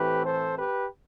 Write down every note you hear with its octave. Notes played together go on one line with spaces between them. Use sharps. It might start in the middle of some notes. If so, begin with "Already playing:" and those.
Already playing: A2 E3 A3 C4 G4 B4
A4 C5
G4 B4